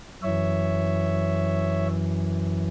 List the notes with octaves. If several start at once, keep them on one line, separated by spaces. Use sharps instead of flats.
F#2 E3 C#5 E5